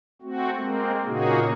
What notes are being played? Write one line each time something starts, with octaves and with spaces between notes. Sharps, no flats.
A3 C4 F#4
G#3 A#3 C4
A#2 C#3 A#3 D#4 F#4 G#4